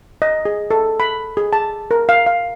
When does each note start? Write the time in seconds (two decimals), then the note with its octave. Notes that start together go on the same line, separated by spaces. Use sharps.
0.22 D#5
0.45 G#4
0.71 A4
1.00 B5
1.37 G#4
1.53 A5
1.91 A#4
2.09 F5
2.26 F5